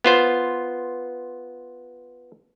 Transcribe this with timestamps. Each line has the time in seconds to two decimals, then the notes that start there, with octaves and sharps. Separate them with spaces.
0.04 B3 F4 C5